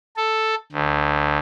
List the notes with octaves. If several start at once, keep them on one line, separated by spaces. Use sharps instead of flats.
A4
D2